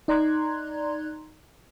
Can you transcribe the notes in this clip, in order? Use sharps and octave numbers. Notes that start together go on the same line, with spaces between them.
D#4 D5 A#5 C6 F#6 G#6